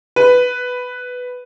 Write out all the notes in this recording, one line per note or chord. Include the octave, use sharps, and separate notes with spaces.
B4